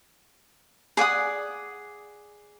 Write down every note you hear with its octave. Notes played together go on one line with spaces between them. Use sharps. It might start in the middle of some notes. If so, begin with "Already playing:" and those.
G#4 D5 F#5 D#6